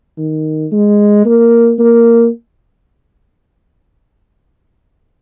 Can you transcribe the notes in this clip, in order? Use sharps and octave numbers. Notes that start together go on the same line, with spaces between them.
D#3
G#3
A#3
A#3